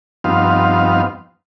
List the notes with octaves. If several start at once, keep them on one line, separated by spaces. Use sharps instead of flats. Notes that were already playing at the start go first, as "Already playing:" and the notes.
G2 F3 B3 C4 D#4 F5